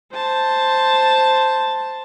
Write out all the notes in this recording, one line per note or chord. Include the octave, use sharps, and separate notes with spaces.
C5 A5